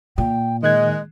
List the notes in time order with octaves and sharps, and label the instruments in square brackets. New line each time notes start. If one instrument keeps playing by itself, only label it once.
[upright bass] A#2 [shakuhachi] G5
[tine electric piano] D#3 F#6 G#6 [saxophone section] G#3 [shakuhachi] D#5